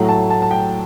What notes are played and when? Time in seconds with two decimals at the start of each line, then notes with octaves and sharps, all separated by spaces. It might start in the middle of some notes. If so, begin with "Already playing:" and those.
Already playing: A2 F#3 A3
0.09 A5
0.30 A5
0.42 A5
0.51 G5